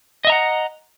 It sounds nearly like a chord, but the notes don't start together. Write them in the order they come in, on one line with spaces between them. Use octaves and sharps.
D#5 E5 A#5 F#5